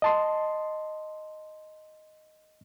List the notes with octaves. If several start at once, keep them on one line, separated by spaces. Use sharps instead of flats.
D#5 A5 C6